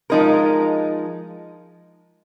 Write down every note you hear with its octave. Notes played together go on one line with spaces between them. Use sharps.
F3 G#3 D#4 A#4